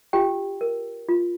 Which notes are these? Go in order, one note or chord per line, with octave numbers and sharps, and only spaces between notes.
F4 G4 G5
A#4
F4